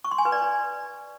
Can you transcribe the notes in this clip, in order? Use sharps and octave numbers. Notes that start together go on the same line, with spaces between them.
C#6
C6
G#5
B4
D5